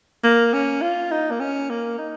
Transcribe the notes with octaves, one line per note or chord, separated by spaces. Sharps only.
A#3
C#4
F4
D#4
A#3
C#4
A#3
D#4